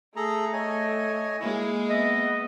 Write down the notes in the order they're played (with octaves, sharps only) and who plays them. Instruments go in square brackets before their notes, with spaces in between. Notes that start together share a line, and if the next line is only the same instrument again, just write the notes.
[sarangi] A3 [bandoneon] G#4 A4 A#5
[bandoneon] C#5 D#5 G#5
[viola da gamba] G#3 A#3 [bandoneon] E4
[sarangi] B3 [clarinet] D#5 [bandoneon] E5